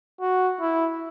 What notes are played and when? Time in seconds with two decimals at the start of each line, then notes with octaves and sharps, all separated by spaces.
0.21 F#4
0.60 E4